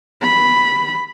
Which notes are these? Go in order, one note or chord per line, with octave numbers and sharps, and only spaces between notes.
B5